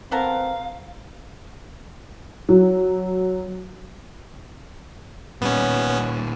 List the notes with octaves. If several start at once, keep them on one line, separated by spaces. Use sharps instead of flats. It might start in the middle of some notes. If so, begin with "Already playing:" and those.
B3 C4 A4 A#4 F5
F#3
A#2 G3 B3 C#4